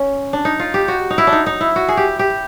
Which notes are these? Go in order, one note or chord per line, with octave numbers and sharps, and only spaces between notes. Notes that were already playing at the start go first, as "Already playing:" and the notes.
Already playing: C#4
D4
D#4
F4
G4
F#4
D#4
E4
D4
D#4
D#4
E4
F#4
G#4
G4
G4